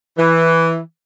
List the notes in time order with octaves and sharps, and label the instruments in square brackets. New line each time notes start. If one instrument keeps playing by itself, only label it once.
[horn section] E3